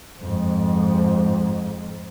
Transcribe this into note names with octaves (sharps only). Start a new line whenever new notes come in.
F2 G#2